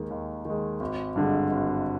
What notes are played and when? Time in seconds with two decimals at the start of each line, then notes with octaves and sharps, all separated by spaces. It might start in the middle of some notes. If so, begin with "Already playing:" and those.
Already playing: D#2 D#3 G#3
0.10 D#2
0.45 D#3 G#3
0.80 G#1
1.16 G2 D3 G#3
1.52 G#1